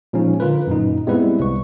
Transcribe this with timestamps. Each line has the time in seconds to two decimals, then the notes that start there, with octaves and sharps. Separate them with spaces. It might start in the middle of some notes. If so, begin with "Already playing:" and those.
0.13 A#2 F3 G#3 C#4 D#4
0.40 D3 F4 A#4 B4
0.67 F#2 A#2 D#4
1.07 G3 G#3 B3 C4 E4 B4
1.40 C2 C#6